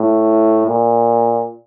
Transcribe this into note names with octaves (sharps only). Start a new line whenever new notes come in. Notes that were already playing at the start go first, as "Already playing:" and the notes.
Already playing: A2
A#2